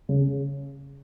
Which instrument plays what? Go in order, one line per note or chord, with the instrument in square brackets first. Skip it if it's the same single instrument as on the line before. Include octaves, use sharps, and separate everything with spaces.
[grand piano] C#3